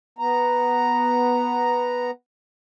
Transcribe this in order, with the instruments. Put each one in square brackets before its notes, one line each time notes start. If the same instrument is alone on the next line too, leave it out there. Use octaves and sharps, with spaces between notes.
[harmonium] B3 A#5